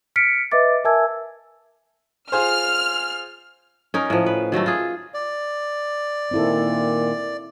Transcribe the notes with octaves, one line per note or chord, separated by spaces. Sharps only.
F6 B6 C#7 D7
B4 D#5 E5 D6 A6
A#4 E5 G#5 A5 E6 G#6
F4 G#4 C5 F6
C#4 D#4 A#4
A2 F3
B4
D#3 F#3 G3 A3
F4 G#4
D5
A#2 D#3 C4 E4 A4